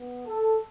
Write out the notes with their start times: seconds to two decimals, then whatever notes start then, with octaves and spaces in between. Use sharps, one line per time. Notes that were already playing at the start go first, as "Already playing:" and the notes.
Already playing: B3
0.27 A4